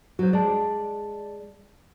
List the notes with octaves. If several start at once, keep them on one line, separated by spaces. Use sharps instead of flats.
F#3 F#4 C5
G#3 D5 A5